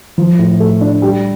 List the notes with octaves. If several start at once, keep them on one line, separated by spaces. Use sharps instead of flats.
F3
A2
A3
D4
G3